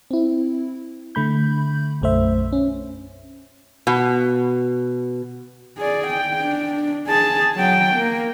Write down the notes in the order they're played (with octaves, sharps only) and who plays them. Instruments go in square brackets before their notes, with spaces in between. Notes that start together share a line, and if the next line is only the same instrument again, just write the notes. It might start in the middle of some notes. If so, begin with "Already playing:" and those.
[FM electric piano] C4 E4
D3 A3 B5 G6
B1 F#2 A3 C5 E5
C#4
[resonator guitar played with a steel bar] B2
[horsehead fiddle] G#4 D5
G5
D4
G#4 A5
F#3 G5
A#3